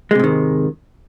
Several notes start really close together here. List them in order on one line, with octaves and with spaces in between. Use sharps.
G#3 C3 G#2 D#3